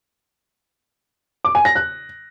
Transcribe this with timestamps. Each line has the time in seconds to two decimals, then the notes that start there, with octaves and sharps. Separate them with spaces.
1.45 D6
1.55 G#5
1.65 A#6
1.75 F#6